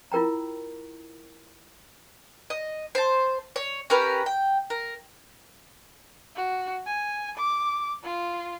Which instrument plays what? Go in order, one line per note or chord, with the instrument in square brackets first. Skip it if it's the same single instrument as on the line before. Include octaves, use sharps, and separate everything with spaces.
[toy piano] E4 F4 A#4 G5 A#5
[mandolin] D#5
C5 A5
C#5
C#4 G4 A#4 B4
G5
A#4
[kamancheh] F#4
G#5
D6
F4